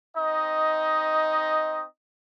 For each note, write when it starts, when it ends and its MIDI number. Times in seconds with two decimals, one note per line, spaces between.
0.16 1.86 60
0.16 1.86 63
0.16 1.86 75